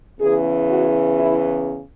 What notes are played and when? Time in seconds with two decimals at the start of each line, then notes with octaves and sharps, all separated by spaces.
0.19 E2 C#3 E3 G#4
0.70 F#4
1.19 E4